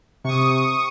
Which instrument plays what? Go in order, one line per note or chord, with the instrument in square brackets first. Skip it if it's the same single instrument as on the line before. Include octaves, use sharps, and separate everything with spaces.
[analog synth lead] C3 [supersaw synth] C#6 D#6